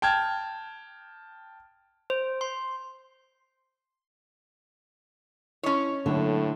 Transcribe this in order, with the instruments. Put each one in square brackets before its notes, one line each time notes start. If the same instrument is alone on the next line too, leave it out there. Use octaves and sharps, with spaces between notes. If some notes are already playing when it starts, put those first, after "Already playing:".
[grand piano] G5 A5 F6 G#6
[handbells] C5
C6
[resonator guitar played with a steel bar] C#4 C#5 [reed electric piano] E4 D#5 A5
[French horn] A2 [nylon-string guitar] D3 [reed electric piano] F#3 A#3 D4